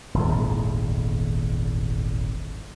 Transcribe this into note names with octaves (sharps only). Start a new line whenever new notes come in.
D#1 G#1 E2